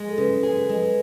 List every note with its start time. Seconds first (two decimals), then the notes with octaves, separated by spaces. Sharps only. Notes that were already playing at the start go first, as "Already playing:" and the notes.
Already playing: G#3
0.09 A4
0.18 C#3 B4
0.43 G#4
0.56 B4
0.69 G#3